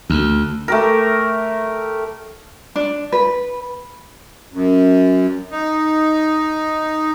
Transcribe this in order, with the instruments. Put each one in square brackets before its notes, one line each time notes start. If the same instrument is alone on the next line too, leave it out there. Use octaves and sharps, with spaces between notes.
[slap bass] D2
[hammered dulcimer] A3 G4 A#4
[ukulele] D4
B4
[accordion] F#2
D#4